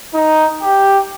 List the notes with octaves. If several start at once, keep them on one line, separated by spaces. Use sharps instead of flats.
D#4
G4